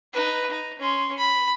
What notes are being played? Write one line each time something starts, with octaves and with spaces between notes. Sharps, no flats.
D#4 B4
D#4
C#4 C6
B5